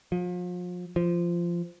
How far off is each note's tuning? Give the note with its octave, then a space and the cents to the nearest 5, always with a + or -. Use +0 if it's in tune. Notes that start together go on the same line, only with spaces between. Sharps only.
F3 +35
F3 -15